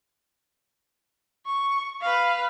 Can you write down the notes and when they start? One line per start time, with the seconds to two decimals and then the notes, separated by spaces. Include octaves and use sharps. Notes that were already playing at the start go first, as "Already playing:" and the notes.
1.46 C#6
2.01 B4 F5